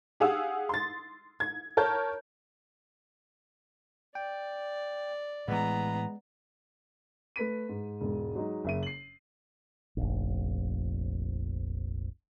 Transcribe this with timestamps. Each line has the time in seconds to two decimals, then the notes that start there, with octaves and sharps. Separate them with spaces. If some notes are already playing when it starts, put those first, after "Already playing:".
0.20 G4 G#4 F5 F#5 D#6 E6
0.69 C6 A6
1.40 G#6
1.77 A#4 C#5 A5 A#5 G6
4.15 D5 G5
5.48 A2 E3 G#3 B3 A#5
7.36 A3 B4 B6 D#7
7.69 G#2
8.01 E1 G#2
8.35 F#3 G#3 D#4
8.64 F#1 E5 D#7
8.83 C7 F#7
9.97 F1 A#1